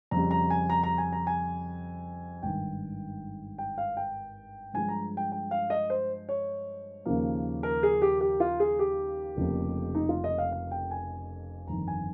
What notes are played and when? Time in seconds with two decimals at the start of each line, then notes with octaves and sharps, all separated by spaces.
0.11 F2 C#3 G3 A#5
0.31 A#5
0.50 G#5
0.70 A#5
0.83 A#5
0.98 G#5
1.13 A#5
1.27 G#5
2.42 G#1 G2 D#3 G5
3.58 G5
3.78 F5
3.97 G5
4.74 G2 F3 G#3 G#5
4.89 A#5
5.17 G5
5.32 G5
5.51 F5
5.70 D#5
5.90 C5
6.29 C#5
7.06 D#2 C#3 F3 A#3
7.63 A#4
7.83 G#4
8.02 G4
8.21 G4
8.40 F4
8.60 G#4
8.79 G4
9.36 F1 F2 C#3 F3 A#3
9.95 D#4
10.09 F4
10.24 D#5
10.38 F5
10.52 F5
10.71 G5
10.91 G#5
11.67 G1 F2 D#3 A#5
11.88 G#5